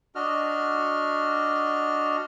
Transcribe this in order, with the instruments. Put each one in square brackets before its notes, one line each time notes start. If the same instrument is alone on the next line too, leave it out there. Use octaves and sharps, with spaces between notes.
[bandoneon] D4 F#4 D#5 F6